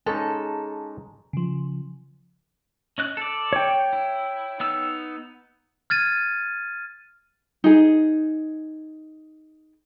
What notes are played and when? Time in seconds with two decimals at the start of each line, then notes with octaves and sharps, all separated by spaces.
0.06 G#3 C#4 D#4 G#4 A4 A5 A#5
1.33 C#3 F3
2.98 C#4 D#5 F#6
3.17 A4 D5
3.53 C#5 G5
3.93 E4
4.60 B3 D#4 E6
5.90 F6 G#6 A6 D#7
7.64 D#4 G#4